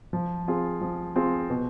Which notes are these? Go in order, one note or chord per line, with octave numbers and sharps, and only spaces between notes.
F3
C4 F4 G#4
F3
C4 F4 G#4
B2